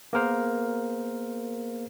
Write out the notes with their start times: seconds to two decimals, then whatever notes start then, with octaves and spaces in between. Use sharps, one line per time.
0.13 A#3 B3 G#4 A#4 C5 F5